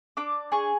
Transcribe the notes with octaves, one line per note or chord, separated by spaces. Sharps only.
D4 D6
G#4 C#6